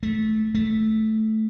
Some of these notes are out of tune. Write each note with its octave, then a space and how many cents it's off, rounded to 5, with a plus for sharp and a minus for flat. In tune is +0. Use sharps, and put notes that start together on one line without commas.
A3 -20
A3 -10